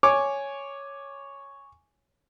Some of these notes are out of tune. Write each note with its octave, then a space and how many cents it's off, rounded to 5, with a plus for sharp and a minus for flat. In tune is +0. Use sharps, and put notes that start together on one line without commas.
C#5 +0 G#5 +0 D6 +0